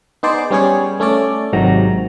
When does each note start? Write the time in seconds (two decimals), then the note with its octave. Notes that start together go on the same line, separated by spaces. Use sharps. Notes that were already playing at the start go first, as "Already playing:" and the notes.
0.23 B3 D#4 G#4 C5 D5
0.51 G3 B3 C#4 G4 G#4 C#5
1.00 A3 C#4 A4 D5
1.53 G#1 G#2 C3 D#3 F#3 A#5